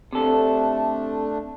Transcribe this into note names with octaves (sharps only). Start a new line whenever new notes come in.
C3 A3 D4 A4